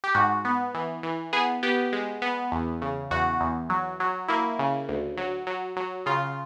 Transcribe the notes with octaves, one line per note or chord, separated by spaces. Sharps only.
G4
G#2 F#4
B3
E3
E3
B3 G#4
B3 G4
G#3
B3
E2
C#3
E2 F#4
E2
F#3
F#3
A#3 E4
C#3
D2
F#3
F#3
F#3
C#3 F4